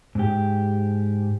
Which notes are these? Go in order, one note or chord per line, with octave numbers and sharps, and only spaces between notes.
G#2 G4